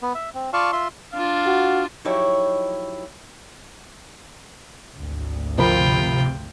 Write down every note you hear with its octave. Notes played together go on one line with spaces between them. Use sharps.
B3
E5
C4
F4 D5 F5 A5 C#6
F4 E5 C6
D4 F4 F5
F#4
F3 F#3 D#4 E4 G4 C#5
G#1 D2
C3 F3 F4 A#4 G5 B5